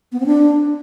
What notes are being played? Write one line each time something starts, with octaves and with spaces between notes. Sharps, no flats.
B3
C4
D4